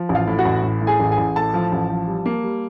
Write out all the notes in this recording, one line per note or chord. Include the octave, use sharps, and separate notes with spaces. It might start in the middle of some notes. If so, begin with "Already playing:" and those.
Already playing: F3
A1
F4 F5
A2
F#4 F#5
A1
A2
A2
G#4 G#5
A1
G#4 G#5
A1
A2 A4 A5
F3
A1
F3
G3
A#3
G3